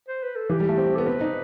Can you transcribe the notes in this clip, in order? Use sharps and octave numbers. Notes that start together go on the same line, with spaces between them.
C5
B4
A4
E3 G4
G3
A3
C4
B3 A4
C4 B4
D#4